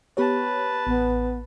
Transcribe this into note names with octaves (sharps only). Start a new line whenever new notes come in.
B3 G4 B4 C#5 A5
A1 B3